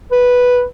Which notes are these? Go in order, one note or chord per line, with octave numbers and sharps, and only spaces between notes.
B4